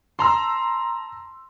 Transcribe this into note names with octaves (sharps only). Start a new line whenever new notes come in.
A5 A#5 C6 E6